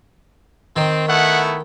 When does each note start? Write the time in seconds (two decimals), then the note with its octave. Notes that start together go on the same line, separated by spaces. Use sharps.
0.76 D#3 C4
1.09 A3 B3 E4 F#5